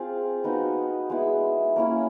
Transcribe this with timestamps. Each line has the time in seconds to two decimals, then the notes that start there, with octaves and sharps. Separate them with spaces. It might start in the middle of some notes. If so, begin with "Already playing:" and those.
Already playing: C4 F4 G#4
0.44 B3 D#4 F#4
1.10 G#3 B3 E4
1.76 A#3 C#4 E4